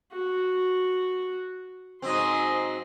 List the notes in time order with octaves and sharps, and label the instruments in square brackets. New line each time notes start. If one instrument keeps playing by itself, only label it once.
[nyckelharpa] F#4
[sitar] G#2 F#3 C4 [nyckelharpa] D#5 C6